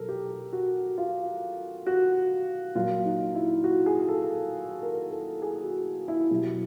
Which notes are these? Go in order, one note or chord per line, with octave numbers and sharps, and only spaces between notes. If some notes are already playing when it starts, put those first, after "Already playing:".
Already playing: B2 F#3 A4 A#4
G4
F#4
F4
F#4
A#2 F#3 F4
D#4
E4
F#4
G#4
A4
A#4
A4
G#4
F#4
E4
B2 F#3 G4